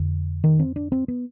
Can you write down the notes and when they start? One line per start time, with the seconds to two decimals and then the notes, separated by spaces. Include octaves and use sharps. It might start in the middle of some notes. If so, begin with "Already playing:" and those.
Already playing: F2 D3
0.44 D#3
0.59 C4
0.76 D4
0.92 C4
1.08 B3